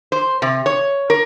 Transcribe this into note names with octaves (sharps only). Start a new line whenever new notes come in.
C5
C3
C#5
A#4